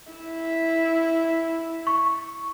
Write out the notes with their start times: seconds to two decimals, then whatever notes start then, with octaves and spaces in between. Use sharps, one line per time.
0.12 E4
1.87 C#6